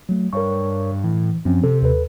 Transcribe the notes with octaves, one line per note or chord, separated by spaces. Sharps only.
F#3 A3
G2 A#4 C#5 C#6
A2 E3
F#2 F3 C4 C#4
C3 A4
D#2 A4 B4